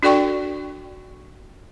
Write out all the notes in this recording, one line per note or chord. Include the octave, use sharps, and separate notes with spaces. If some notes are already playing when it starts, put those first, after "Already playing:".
D4 F#4 A4 D5 G5 C#6